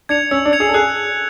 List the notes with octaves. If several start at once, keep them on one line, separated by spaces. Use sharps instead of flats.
D4 G#6 C#7 F7
C#4 E6
D4
G#6 C#7 F7
G#4
A4
G#4 F#6